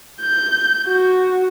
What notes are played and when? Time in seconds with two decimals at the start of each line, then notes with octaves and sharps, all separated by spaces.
0.22 G6
0.88 F#4